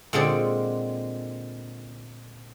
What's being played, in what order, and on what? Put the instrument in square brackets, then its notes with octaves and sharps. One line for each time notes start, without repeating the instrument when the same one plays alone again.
[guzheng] A#2 D3 G#3 C4 G#4 D5